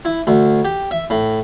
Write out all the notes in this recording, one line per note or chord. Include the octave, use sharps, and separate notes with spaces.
E4
D2
G4
E5
A2